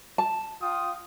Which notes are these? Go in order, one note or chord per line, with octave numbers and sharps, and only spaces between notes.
A5
F4 G5 D#6